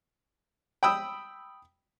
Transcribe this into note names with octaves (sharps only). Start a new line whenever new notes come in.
G5 B5 D#6 E6